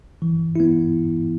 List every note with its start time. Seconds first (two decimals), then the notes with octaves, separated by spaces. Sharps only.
0.22 E3
0.56 B3 E4